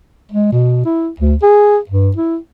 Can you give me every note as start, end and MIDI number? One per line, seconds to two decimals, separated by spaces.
0.31 0.52 56
0.52 0.84 47
0.85 1.10 64
1.20 1.34 38
1.42 1.78 68
1.89 2.11 43
2.16 2.37 64